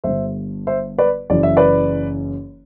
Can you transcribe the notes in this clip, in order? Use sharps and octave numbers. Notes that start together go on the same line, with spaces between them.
G1 G2 D3 C5 E5
C5 E5
B4 D5
F#1 F#2 E3 D5
E5
B4 D5